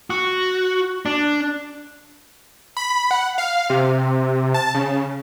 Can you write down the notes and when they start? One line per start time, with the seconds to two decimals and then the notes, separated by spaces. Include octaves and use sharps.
0.10 F#4
1.06 D4
2.77 B5
3.11 F#5
3.38 F5
3.70 C3
4.54 A5
4.75 C#3